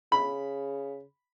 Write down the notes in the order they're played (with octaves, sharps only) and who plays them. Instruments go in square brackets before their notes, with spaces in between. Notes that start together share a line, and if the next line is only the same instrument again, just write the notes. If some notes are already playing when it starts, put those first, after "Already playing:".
[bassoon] C#3 [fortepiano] B5